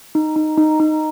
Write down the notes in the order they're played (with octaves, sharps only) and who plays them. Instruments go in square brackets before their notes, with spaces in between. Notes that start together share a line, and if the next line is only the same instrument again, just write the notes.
[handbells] D#4
D#4
D#4
D#4